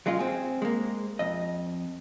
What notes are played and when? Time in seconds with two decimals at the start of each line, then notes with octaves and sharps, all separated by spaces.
0.06 F#3 G#3 C#4 F4
0.19 C4 G#4
0.62 G#3 A#3
1.19 F2 D#5